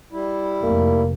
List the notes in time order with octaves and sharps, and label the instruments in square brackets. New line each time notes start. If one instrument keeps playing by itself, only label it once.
[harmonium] G3 E4
[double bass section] F1 [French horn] A#3